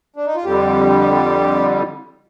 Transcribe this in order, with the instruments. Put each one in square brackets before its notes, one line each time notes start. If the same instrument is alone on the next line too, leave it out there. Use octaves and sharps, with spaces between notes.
[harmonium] D4
D#4
F4
[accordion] F2 D3 G3 [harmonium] G4